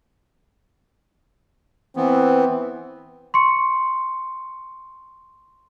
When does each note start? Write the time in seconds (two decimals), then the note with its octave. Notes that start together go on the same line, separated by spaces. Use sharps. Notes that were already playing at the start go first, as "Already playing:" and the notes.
1.96 E3 B3 C4
3.34 C6 C#6 C#7